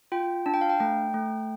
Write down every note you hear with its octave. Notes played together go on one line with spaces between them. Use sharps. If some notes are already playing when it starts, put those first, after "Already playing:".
F4 G5
D4 A5
G5
F5
G5
A3 G5
A3